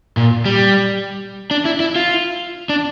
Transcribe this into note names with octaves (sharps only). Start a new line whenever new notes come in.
A#2
G3
D4
E4
E4
F4
D4